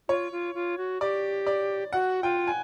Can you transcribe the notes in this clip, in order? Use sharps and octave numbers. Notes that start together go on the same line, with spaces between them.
F4 C#5
F4
F4
F#4
G4 D5
D5
F#4 F#5
F4 G5
G#5